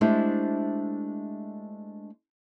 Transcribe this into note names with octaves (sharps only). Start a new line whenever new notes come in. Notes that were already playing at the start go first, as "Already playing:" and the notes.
G#3 A3 D4 E4 G4 C5